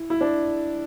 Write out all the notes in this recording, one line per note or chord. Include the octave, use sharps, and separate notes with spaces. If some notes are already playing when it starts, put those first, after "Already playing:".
Already playing: E4
E4
D4